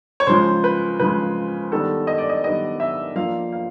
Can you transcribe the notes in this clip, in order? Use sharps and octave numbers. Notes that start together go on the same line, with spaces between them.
C#5
C#3 F3 G#3 C5
B4
C#3 F3 G#3 B4
D#3 G3 B3 D4 A4
D#5
D5
D#5
D#3 G3 B3 D4 D#5
E5
F3 A#3 D4 F5
F5